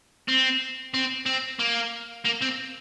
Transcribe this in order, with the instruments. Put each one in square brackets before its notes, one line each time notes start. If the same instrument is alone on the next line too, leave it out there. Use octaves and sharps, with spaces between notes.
[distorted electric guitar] C4
C4
C4
A#3
A#3
C4